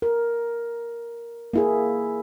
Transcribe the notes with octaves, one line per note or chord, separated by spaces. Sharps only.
A#4
A#3 E4 G#4